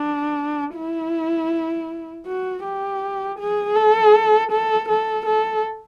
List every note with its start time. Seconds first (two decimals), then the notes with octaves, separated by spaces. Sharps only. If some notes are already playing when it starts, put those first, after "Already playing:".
Already playing: D4
0.76 E4
2.27 F#4
2.64 G4
3.39 G#4
3.76 A4
4.52 A4
4.89 A4
5.26 A4